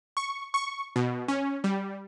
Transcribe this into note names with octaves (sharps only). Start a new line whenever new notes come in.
C#6
C#6
B2
C#4
G3